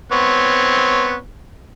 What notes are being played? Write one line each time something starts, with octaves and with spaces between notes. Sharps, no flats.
B3 C4 C#5